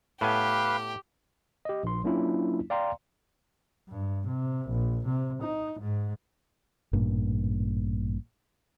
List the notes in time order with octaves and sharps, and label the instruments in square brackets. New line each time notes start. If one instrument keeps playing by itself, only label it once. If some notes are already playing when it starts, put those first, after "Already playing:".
[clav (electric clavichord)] A2 B3 G#5 [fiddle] G4 [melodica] B4 F5
[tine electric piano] G4 D#5
A#1 C6
F#3 A#3 C#4 D4 E4 F4
D5 F5 G5 A#5 C6
[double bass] G2
C3
A#1
C3
D#4
G#2
[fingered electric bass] A1 G2 A#2